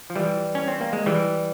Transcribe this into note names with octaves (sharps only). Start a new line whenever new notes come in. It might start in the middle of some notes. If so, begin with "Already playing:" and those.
F3
E3 G3
C#4
C4
A#3
G#3
E3 G3